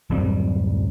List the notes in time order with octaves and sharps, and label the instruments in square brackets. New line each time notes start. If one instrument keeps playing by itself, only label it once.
[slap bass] D1 F#2 G3 C4